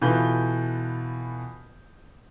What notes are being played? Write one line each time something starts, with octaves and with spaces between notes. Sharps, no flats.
B2 E3 F4 A4 B4 G6